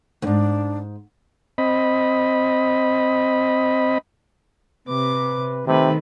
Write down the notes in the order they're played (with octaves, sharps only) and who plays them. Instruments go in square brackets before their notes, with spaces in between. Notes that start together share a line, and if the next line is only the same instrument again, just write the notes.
[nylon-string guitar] D2 G#2 [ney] D4
[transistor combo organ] C4 D#5 B5
[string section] C3 [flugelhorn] B4 [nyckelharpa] D6
[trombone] C3 [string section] D#3 [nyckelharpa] A3 B4 [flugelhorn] C4